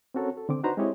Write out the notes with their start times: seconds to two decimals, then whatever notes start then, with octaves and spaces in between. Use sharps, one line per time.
0.14 C4 C#4 F#4 A4 A#4 C#5
0.37 A4
0.49 D3 C4 D6
0.63 D4 D#4 F#4 B4 C5 A#5
0.77 G#3 C4 E4 G4 C#5 D#5